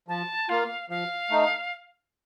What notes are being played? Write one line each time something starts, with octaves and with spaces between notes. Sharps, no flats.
F3 A5
A#3 F4 F5
F3 F5
A3 D#4